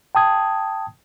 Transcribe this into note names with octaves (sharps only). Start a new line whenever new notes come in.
G5 A5 D#6 G#6